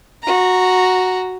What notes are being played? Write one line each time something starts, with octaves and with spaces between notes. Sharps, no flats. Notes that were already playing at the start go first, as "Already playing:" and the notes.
F#4 A#5